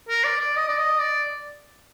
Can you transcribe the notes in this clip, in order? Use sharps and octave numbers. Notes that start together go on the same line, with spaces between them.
A#4
D5
D5
D#5
D5
D#5
D5